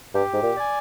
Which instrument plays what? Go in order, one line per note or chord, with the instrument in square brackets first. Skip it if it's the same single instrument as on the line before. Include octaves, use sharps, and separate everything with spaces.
[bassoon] G2 [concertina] G4
[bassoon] G#2
A#2
[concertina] D5 G#5